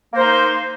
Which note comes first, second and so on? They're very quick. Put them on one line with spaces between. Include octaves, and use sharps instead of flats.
A#3 C5 D#4